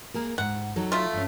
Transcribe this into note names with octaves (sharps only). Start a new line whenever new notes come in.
A#3 G#4 A#4
G#2 F#5
F#3 D#4 A4
A3 F4
G2 C#4